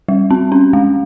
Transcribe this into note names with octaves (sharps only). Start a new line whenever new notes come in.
G3
C4
C#4
G#3